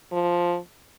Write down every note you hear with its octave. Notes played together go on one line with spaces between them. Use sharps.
F3